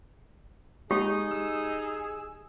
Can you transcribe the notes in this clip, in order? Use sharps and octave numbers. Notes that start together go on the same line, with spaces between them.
G#3 D#4 G4 G#4
E6